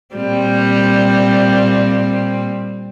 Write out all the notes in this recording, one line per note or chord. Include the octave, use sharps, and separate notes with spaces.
A#2 G3 C4